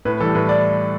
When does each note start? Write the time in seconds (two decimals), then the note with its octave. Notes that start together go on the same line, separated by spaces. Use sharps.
0.05 A2 B4
0.20 E3 G3 A4
0.35 A2 B4
0.49 D5